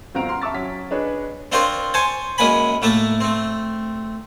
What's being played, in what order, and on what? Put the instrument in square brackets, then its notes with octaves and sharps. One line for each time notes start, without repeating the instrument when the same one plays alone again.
[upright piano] G1 C4 F#4 F5 A#5 D7
F#5 A#5 C6 F6
E5 A5 C#6 D6 E6 A6
F#3 C#4 B6
D4 G#4 B4 C#5 D#5
[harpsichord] C4 D4 F4 A#4 C5 C#5
C5 C#5 G#5 A5
F#2 G#3 A#3 B4 G#5 B5
A2 A3 A#3 E5 A5
A3 C4